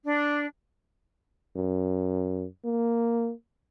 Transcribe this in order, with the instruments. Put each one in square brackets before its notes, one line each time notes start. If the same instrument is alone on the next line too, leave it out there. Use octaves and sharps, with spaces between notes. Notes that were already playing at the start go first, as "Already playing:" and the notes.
[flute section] D4
[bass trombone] F#2
A#3